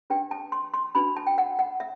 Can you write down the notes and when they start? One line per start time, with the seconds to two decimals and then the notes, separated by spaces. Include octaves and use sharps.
0.10 D4 G4 B4 G5
0.31 A5
0.52 C6
0.74 C6
0.95 D4 F#4 B4 B5
1.16 A5
1.27 G5
1.38 F#5
1.59 F#5
1.80 E5